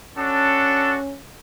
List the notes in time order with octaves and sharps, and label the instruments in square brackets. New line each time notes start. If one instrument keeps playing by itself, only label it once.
[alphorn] C#4 [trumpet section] D4 F#4 A4